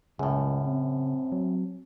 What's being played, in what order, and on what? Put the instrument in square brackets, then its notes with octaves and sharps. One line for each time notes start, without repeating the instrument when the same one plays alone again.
[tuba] C#2 [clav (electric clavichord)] F#2 A2 [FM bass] C#3
[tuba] C4
[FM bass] F#3